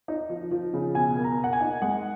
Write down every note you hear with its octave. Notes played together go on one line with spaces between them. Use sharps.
D#4
F3
F3
C#3
B2 G#5
A#3
A#5
A#3
F#5
G#5
D#4
G#3 F#5